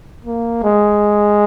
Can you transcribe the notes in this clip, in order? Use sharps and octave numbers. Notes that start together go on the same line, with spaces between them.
A#3
G#3